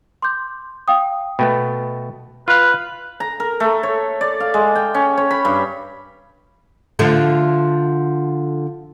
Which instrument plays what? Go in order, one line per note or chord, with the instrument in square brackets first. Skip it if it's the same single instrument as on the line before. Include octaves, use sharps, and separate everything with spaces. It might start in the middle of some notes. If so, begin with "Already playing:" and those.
[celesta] C6 D6 G6
F5 G5 D#6
[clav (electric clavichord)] B2 A3 B3 [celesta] G5
[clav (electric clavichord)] F4 F5 [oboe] B4 [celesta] F6 F#6
[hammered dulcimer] A#5
A#4
A3
C#5
D5
F5
G#3
G5
C#4
C#5
B5
G2
[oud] D3 F3 A3